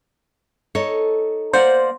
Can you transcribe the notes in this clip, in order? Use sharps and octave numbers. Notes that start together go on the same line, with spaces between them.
D#4 A4 C#5
A#3 C5 D5 F#5